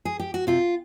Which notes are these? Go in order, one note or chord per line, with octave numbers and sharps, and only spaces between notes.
G#4
G4
F#4
C3 F4